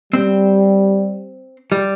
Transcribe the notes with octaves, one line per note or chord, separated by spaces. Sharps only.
G3 C4
G3